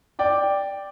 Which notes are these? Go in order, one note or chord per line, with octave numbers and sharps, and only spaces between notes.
D5 G5 D6